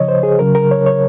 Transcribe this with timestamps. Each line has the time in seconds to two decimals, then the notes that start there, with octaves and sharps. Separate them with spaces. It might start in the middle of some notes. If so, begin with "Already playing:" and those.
Already playing: C#3 F3 C#5 D#5
0.08 C5
0.23 G#4
0.39 C#3 F#3 A#4
0.55 A#4
0.71 C#5
0.86 C#5